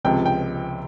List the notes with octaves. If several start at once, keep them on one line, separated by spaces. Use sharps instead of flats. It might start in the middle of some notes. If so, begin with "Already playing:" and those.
C#2 C3 F3 G#3 G5
G5